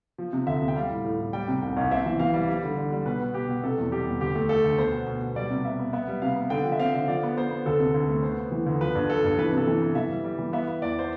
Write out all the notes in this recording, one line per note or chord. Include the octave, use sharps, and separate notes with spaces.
F3
C3
D2 E5
C3
G5
G3 F5
A2
A2
A2
G3 G5
C3
C2 G5
C2
C4 E5
E3
E3 F5
G3
G3
D3
D3
G3
B2 B4
B3
B2 G4
B2
C3 A4
E2
G3 G4
E2
D2 G4
A3
A3 A4
D2
B3 C5
B2
B2
B2
G3 D5
C3
B3 E5
B3
B3 E5
G3
C3 F5
B3
D3 G5
F3
E5
C4 F5
D3
F3 D5
B3
B3 C5
B3
D2 A4
C3
D2
A3
B3 C5
B3
E3
D2
F3 B4
G2
F3 A4
G2
E3 B4
C3
A4
E3
B3
E3 E5
G3
G3
E3
B3 E5
B3
E2 D5
C5